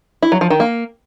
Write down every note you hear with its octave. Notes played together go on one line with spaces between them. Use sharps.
E4
F#3
F3
D#3
A#3